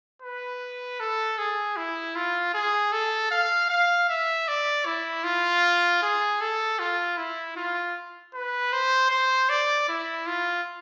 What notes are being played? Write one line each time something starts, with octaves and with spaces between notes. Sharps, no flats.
B4
A4
G#4
E4
F4
G#4
A4
F5
F5
E5
D5
E4
F4
G#4
A4
F4
E4
F4
B4
C5
C5
D5
E4
F4